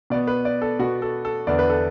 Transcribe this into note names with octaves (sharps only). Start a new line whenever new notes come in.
B2 B3 D5
B4
D5
A4
B2 B3 F#4
A4
A4
E2 D3 B3 D5
B4
A4